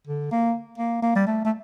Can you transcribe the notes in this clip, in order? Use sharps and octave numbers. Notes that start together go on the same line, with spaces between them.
D3
A#3
A#3
A#3
G3
A3
A3